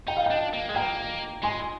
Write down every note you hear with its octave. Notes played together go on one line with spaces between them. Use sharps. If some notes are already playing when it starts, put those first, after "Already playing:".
D#4 G5
F5
D4 D#5 G5
A#3
G#3
A#3 G5 A#5
G#3 G#5 C6